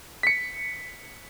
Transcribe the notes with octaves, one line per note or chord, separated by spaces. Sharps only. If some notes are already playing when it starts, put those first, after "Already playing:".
B6 C#7